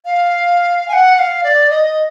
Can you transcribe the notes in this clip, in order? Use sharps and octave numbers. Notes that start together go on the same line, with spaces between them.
F5
G#5
F#5
F#5
F5
D5
D#5